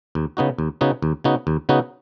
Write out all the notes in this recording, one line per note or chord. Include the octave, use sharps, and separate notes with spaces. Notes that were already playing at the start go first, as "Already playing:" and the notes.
D#2
C#3 B3 D#4 F#4
D#2
C#3 B3 D#4 F#4
D#2
C#3 B3 D#4 F#4
D#2
C#3 B3 D#4 F#4